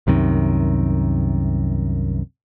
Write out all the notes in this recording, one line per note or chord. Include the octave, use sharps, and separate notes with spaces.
C2 F#2 C3 D#3